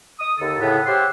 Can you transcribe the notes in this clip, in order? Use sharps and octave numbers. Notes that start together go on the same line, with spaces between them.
D#6
D#2 D3 D#4 A4
A2 C#3 B3
G4 C5 C#5 E5 F#5 C6